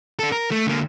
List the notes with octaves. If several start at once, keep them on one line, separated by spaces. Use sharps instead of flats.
D4 A4
A#4
A3
D3 A#3